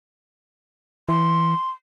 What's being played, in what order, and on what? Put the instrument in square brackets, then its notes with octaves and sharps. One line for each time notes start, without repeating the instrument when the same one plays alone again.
[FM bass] E3 [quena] C6